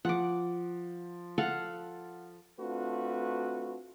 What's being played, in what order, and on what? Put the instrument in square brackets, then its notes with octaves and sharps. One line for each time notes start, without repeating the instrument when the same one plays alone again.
[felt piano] F3 [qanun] F#5 D6
[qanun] A4 F5 F#5
[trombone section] A3 C4 D4 F4 F#4 B4